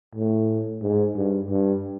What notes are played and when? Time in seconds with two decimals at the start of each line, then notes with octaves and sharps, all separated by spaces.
0.15 A2
0.82 G#2
1.16 G2
1.50 G2